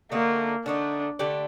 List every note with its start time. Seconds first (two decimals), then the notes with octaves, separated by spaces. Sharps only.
0.12 D3 A3 A#3 D#4
0.65 D3 A3 D4 D#4
1.19 D3 A3 D4 G4